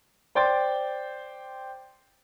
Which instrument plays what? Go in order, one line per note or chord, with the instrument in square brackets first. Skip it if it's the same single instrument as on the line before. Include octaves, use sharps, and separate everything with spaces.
[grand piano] C5 D5 G5 C6 A6